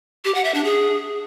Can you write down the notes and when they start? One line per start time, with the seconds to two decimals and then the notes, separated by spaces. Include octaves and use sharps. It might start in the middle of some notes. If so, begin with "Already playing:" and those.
0.25 G4
0.35 F#5
0.44 E5
0.54 D4
0.64 G#4